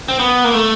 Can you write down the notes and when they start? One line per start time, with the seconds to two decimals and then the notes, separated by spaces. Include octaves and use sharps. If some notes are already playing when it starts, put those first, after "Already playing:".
0.08 C4
0.20 B3
0.44 A#3
0.54 A3